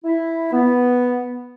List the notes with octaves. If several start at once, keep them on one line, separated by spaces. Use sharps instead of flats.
E4
B3